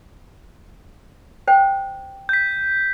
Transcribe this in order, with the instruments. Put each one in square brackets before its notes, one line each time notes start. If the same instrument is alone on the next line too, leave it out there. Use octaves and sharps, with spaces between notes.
[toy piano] C5 G5
[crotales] G6 B6